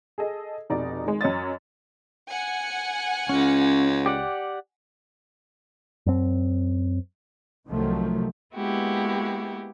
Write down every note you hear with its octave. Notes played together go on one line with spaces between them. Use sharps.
G#4 A4 D#5
F1 B2 D#4 D5 A#5
D#3 G#3
F#2 C#5 D#5 A6
F#5 G#5
C#2 C#4
G4 D5 F#5
F#2 C4
C2 C3 D#3 F3 F#3 A3
G#3 A#3 B3 E4 F#4 G4